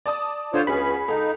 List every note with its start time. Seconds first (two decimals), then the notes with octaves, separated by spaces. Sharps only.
0.06 D5 A5 D#6
0.54 D3 D4 F4 C5 C#5
0.67 C#2 B3 C#4 F#4 G#4 B5
1.08 C#2 D#4 A4